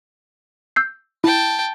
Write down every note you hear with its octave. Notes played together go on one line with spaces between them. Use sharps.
E6 G6 C7
E4 G5 A5